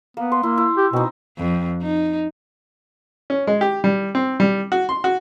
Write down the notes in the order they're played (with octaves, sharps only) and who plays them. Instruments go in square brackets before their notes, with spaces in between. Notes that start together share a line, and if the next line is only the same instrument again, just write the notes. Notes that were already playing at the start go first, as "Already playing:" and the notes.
[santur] A#3 [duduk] B3
[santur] C6
[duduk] A#3 [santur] E4
[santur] E4
[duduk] G4
[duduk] B2 [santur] C4 D#4
[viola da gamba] F2
D#4
[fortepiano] C#4
G#3
G4
G3
C4
G3
F#4
C6
F#4